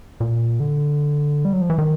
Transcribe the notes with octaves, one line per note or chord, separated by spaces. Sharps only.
A#2
D3
G3
F#3
F3
E3
D#3